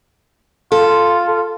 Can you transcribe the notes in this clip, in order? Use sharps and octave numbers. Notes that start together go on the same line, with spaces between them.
F4 A4